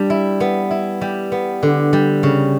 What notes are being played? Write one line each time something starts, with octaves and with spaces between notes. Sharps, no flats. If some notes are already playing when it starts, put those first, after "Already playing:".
Already playing: G3 D4
E4
B3
E4
G3
B3
D3
G3
C#3